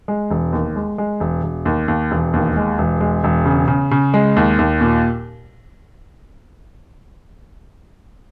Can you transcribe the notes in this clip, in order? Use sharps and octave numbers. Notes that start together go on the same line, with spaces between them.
G#3
E1
D#2
G#3
G#3
E1
E1
D#2
D#2
E1
D#2
G#3
E1
G#3
E1
C#3
C#3
C#3
G#3
D#2
D#2
A#2